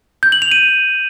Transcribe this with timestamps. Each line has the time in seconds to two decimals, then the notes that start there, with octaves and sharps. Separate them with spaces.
0.23 G6
0.32 F#7
0.42 F7
0.51 D#7